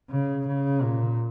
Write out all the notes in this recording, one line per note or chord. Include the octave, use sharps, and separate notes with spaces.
C#3
C#3
A#2